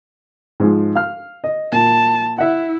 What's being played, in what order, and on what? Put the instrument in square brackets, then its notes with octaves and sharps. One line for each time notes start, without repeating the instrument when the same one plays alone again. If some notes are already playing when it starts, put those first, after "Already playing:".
[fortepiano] G#2 F3 G#3
F5 F6
D#5
[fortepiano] A#2 [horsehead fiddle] A5
[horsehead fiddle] E4 [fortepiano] E5 F#5